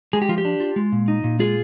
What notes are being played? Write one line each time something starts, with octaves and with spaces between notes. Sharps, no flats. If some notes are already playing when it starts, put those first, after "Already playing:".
G#3 G#4
G4
F3 F4
G4
D4
F4
G#3
A#2
D#4
A#2
G#3 F4 G#4